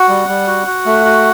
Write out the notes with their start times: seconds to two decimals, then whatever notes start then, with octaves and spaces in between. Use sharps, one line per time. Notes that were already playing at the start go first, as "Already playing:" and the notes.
Already playing: F#4 F#5
0.09 G3
0.28 G3
0.47 F#4
0.67 F#4
0.86 A3
1.05 F#4